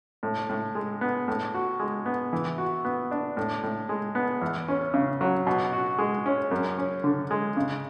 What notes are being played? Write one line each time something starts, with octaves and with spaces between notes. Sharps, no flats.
A2
A2
G#3
B3
A2
F#4
G#3
B3
E3
F#4
B3
D4
A2
A2
G#3
B3
E2
C#4
C#3
F#3
B2
F#4
G#3
C#4
F#2
C#4
D3
G#3
C#3